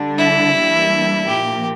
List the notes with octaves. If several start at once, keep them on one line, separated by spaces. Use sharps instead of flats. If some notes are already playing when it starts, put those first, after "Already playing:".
Already playing: D3 G3 D4
E4
E3 G3 A#3 D4
A#2 F3 A#3 G4